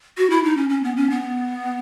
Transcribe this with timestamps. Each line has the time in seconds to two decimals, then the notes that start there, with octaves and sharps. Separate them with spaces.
0.18 F#4
0.30 E4
0.44 D#4
0.57 C#4
0.70 C#4
0.83 B3
0.96 C#4
1.10 B3